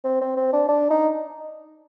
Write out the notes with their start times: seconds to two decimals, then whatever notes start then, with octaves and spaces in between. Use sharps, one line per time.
0.04 C4
0.21 C4
0.37 C4
0.53 D4
0.69 D4
0.90 D#4